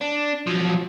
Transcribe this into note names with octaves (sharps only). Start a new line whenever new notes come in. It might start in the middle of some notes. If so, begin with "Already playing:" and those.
D4
F3 F#3